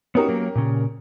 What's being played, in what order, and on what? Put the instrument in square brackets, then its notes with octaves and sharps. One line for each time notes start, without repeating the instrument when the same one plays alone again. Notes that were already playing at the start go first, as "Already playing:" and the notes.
[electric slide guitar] B3 D#4 F#4 [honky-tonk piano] C#4 G4 A#4
[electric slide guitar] F#3 A#3
A#2 C#3